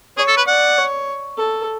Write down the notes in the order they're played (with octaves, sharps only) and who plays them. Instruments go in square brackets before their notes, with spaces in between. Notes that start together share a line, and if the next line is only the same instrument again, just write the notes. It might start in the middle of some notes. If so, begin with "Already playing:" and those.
[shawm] G#4 [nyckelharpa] C#5
[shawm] A4
B4
[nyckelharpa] D5 [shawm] F#5
[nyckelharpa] C#5
A4